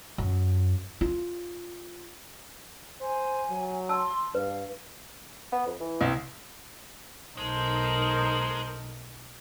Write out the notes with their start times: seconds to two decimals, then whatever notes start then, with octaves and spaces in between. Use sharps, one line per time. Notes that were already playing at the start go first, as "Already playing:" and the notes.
0.18 F#2
1.01 F4
3.01 C5 G#5
3.50 F#3
3.89 A5 C6 E6
4.35 G2 B4 F5
5.52 B3
5.66 F2
5.81 E3
6.01 C2
7.37 B1 G#3 D#4 A4 A#4 C5